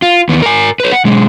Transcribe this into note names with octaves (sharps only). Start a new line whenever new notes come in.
F4
D#2 B3
A#4 G#5
B4 C#5
F#5
B1 G#3